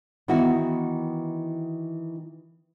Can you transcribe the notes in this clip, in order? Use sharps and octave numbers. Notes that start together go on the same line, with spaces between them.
D#3 E3 B3 E4 F#4